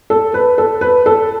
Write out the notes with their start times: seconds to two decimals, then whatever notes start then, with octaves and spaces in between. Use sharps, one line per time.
0.10 A4
0.34 B4
0.58 A4
0.81 B4
1.06 A4